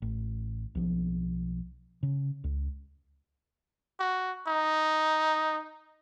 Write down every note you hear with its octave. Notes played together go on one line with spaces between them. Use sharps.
A1
B1 F3
C#3
C#2
F#4
D#4